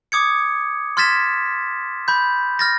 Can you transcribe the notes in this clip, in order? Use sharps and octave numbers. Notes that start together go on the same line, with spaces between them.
D6 D#6 G#6 C#7
C6 F6 G#6 A6 B6 E7
B5 G6
F6 A6 A#6